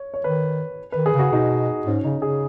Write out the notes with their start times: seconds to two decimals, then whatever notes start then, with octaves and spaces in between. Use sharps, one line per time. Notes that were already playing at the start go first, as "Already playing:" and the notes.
Already playing: C#5
0.14 C#5
0.24 D#3 B4
0.92 D#3 B4
1.06 G#4
1.14 C#3
1.19 F#4
1.32 B2 D#4
1.86 G#2 C#4
2.04 C#3 D#4
2.22 C#3 G#4